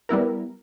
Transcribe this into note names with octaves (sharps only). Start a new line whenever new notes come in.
G3 B3 E4 A#4